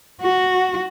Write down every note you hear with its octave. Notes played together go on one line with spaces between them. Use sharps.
F#4